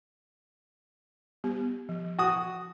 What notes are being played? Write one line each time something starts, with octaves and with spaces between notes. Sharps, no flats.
G3 B3 G4
F3
F#4 D#6